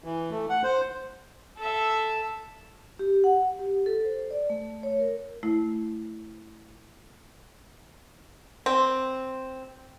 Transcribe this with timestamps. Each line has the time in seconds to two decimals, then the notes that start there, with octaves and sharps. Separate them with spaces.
0.04 E3
0.30 A3
0.49 F#5
0.64 C5
1.58 A4 E5
2.99 G4
3.24 F#5
3.59 G4
3.86 A4
4.05 C5
4.31 D5
4.50 A3
4.83 C#5
5.00 A#4
5.43 A3 E4
8.66 C4